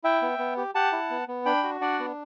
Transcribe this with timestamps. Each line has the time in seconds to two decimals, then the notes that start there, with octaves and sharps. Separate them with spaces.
0.04 E4 E5 G5
0.22 B3
0.39 B3
0.57 G4
0.75 G4 F#5 A5
0.92 E4
1.10 B3
1.28 B3
1.45 D4 G5 B5
1.63 F#4
1.81 D4 D5 F#5
1.99 B3